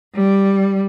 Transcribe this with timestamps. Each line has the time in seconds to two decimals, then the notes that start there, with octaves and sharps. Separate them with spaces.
0.14 G3